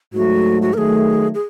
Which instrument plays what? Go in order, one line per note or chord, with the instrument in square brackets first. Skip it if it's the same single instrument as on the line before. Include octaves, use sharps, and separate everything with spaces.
[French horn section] G#2 F#3 A3 [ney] F#4
[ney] F#4
[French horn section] D#3 F#3 A3 [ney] G#4 A#4
[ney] G#4